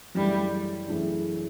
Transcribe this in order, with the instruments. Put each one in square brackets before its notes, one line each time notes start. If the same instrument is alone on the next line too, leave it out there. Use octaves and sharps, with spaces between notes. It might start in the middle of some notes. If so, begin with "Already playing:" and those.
[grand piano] F#2 C#3 E3 A3 D4 [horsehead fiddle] G3
[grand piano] F#2 C#3 E3 A3 D4